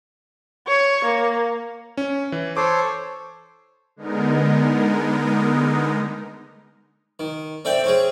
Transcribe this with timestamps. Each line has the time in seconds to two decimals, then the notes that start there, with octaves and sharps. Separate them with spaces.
0.68 C#5 C#6
1.05 A#3
1.97 C#4
2.32 E3
2.57 A4 C5 C#5 D6
3.96 D3 G#3 B3 D#4 A#4
7.19 D#3
7.65 C4 A4 D5 E5 G5
7.84 C4 C#4 G#4